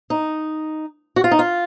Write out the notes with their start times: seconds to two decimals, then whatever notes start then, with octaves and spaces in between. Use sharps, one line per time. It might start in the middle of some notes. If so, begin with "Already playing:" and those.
0.10 D#4
1.16 F#4
1.24 F4
1.31 D#4
1.39 F4